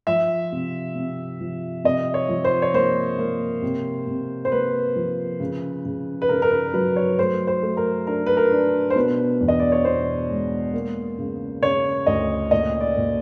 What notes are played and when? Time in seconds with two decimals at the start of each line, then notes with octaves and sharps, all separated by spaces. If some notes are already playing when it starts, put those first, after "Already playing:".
0.07 F3 E5
0.52 C3
0.96 C3
1.41 F3
1.84 C3 D#5
2.14 C#5
2.29 F3
2.44 C5
2.62 C#5
2.74 A#3 C5
3.18 A#3
3.62 C3
4.07 C3
4.45 C5
4.52 A#3 B4
4.96 F3
5.40 C#3
5.85 C#3
6.22 B4
6.29 C#3 A#4
6.42 A#4
6.51 B4
6.74 F#3 B4
6.96 C#5
7.18 A3 C5
7.47 C5
7.63 A3
7.77 A#4
8.07 D4 A#4
8.26 B4
8.37 A#4
8.52 D4
8.90 C5
8.96 B2 B4
9.41 E2
9.48 D#5
9.60 D5
9.72 C#5
9.85 B2 C5
10.29 G#3
10.74 A#3
11.19 C#3
11.62 C#3 C#5
12.06 D2 D#5
12.51 A#2 D#5
12.81 D5
12.97 A#2